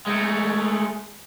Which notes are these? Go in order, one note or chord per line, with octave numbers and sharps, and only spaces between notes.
G#3 A3